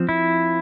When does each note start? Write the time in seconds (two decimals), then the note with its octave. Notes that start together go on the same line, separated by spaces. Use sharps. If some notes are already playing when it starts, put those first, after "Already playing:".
Already playing: F3 C4
0.09 E4